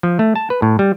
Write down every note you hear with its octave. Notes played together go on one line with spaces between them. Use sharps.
F3
A3
A5
B4
A2
G3